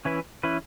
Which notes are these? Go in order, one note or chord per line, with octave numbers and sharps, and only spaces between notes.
E3 C#4 E4 B4
E3 C#4 E4 B4